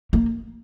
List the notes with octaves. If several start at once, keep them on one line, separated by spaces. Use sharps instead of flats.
A#3